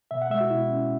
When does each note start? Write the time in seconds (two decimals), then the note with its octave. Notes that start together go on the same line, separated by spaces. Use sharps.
0.11 B2 E5
0.22 F#5
0.30 G#3 E5
0.41 F#4
0.50 B2 E4
0.70 C#4